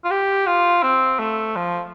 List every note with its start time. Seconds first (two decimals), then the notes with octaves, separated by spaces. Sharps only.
0.04 F4
0.11 G4
0.46 F4
0.83 C4
1.19 A3
1.56 F3